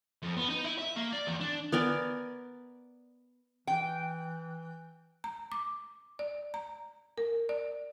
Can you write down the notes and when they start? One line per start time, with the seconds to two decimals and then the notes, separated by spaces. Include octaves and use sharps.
0.23 F2
0.37 B3
0.50 D#4
0.65 E4
0.79 E5
0.96 A#3
1.13 D5
1.27 E2
1.40 D4
1.72 B3 A#4 D5 G#5
3.67 E3 G5
5.24 A#5
5.52 D6
6.19 D5
6.54 A#5
7.18 A#4
7.49 D5